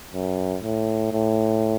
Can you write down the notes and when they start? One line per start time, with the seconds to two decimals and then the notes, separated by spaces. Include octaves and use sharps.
0.13 F#2
0.63 A2
1.13 A2